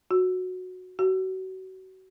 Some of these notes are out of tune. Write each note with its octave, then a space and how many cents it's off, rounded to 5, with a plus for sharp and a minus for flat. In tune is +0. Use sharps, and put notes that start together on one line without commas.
F#4 -10
F#4 +30